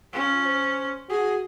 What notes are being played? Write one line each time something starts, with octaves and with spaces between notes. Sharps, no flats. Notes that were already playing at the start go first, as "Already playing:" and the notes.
C#4 F4
C5
F#4 G#4